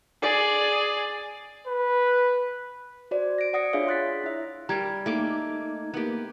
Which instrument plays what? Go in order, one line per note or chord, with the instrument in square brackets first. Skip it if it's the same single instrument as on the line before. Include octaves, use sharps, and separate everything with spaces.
[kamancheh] G#4 D5
[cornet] B4
[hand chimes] F#4 C5 D5
A#6 D7
D5 F#5 D#6 A#6 C#7
D4 F4 G#4 C#5 E5 F5
C6 F#6 A6 B6
E4 E5
[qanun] G3 A#4 [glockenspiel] A#5 G#6
[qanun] A3 A#3 D6 [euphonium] D#4
[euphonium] A#3 [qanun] B3 G4